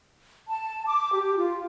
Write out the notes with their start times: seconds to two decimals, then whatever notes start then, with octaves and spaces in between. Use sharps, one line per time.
0.50 A5
0.87 D6
1.13 G4
1.37 F4